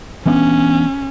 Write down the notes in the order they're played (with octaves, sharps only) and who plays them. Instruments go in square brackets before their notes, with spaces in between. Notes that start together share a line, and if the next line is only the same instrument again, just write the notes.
[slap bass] E3 B3 D4 [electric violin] C#4